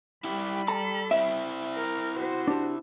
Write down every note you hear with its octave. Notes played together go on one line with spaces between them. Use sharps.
G3 E4 G4 B5
A4 A#5
C4 E4 E5
A#4
F#4 C5
D4 G4